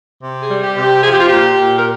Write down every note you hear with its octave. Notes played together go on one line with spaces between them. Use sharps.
C3
G#4
G3
G4
C3
G4
F3 G#4
G4
F4
A#2 G4
A#2
A#4